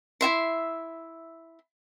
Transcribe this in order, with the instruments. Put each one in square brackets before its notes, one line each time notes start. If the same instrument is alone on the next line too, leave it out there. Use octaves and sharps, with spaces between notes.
[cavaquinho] E4 F#4 E5 C6